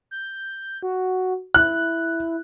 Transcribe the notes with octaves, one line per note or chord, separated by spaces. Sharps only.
G6
F#4
E4 F#6